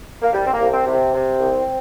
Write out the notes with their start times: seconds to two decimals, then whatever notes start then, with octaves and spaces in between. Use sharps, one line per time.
0.22 A#3
0.33 C2 G3
0.46 C4
0.52 A#3
0.60 C2
0.72 C4
0.85 C3
0.93 C4
1.13 C3
1.39 C2